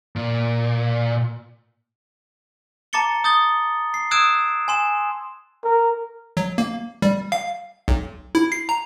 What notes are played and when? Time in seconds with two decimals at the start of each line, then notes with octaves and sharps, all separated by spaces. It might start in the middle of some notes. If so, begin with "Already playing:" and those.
0.16 A#2
2.93 A5 A#5 D6 A6 C#7 G7
3.24 D#6 G6 A6 G7
3.94 C7
4.11 D#6 E6 F#6 G#6 D7 E7
4.68 G#5 C6 E7
5.64 A#4
6.37 F#3
6.58 A#3
7.02 G3
7.32 F5
7.88 B1
8.35 E4
8.52 C7
8.69 A#5